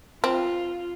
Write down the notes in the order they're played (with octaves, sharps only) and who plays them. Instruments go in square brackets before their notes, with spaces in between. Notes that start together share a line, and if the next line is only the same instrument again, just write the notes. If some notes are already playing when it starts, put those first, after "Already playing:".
[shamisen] C4 [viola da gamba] F4